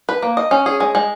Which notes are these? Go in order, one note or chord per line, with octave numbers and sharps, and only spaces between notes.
B4
A#3
D#5
C#4
G#4
G#3
G#3